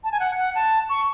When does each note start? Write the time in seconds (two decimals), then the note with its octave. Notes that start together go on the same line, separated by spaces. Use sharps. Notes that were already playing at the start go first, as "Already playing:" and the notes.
0.04 A5
0.12 G#5
0.20 F#5
0.38 F#5
0.55 A5
0.89 C#6